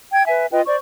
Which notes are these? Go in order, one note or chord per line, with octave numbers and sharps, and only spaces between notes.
G5 G#6
B4 E5 G#5
F4 B4 D#5 G5
C5 D5 C#6